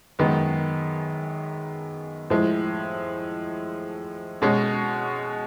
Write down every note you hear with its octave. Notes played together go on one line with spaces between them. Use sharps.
F#2 D#3 G#3 B3
A2 F3 G#3
B2 G#3 C#4